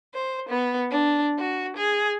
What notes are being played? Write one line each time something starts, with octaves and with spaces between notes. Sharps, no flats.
C5
B3
D4
F#4
G#4